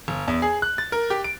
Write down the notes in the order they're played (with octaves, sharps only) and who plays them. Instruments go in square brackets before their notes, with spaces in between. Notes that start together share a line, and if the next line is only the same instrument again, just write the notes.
[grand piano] G1
E2
G#4
F#6
A6
A#4
G4
D7